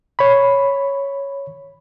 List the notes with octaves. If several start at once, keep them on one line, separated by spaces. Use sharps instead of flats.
C#5 B5